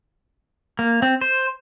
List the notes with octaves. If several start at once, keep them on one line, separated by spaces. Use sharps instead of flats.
A#3
C4
C5